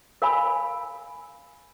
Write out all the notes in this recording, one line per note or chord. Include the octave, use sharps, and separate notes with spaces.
A#4 F5 G#5 B5